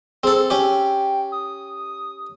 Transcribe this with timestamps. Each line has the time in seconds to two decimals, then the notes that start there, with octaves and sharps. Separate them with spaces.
0.23 C4 G#4 A4
0.50 C#4 G4 G5
1.32 D#6